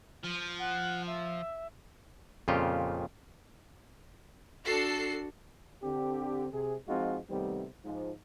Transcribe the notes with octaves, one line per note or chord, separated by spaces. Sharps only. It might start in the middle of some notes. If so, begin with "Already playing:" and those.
F3
F#5
E5
F2 A#2 C#3 F4 G4
D4 F#4 A4 C7
D3 C4 G4
C3 G#4
F3 G#3 C4 D#4 F4 F#4
C3 D#3 G3 A3 B3 C4
G#2 F3